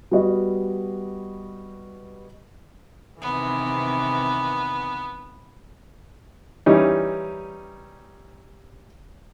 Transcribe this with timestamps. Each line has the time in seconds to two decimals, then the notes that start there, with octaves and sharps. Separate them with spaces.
0.11 G3 B3 F#4 D#5
3.21 C3 D#3 E3 B3
6.66 E3 G3 C#4 D#4